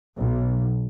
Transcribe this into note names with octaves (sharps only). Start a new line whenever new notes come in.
B1